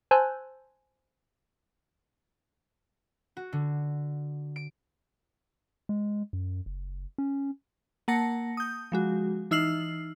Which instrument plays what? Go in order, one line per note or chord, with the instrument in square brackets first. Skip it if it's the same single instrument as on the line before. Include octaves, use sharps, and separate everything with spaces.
[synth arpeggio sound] C5 G#5 A5 E6 F#6 G6
[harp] F#4
D3
D7
[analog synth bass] G#3
F#2
F#1
C#4
[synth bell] A#3 F#5 A5 A#6 C#7
D#6 G6
F3 G#3 F#4
E3 D#4 E6 F6 C7 F#7